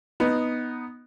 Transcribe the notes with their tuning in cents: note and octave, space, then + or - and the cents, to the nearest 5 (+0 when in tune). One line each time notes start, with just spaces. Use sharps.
B3 +0 D#4 +0